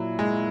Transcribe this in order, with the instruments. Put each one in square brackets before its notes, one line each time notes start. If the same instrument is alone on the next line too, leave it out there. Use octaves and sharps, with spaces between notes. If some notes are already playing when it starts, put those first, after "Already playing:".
Already playing: [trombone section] A#2 A#3 E4 [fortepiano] F#3
[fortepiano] G#3